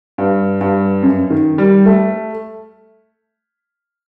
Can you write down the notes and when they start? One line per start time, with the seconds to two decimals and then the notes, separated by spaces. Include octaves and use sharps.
0.18 G2
0.61 G2
1.03 F#2
1.30 D#3
1.58 G3
1.86 A3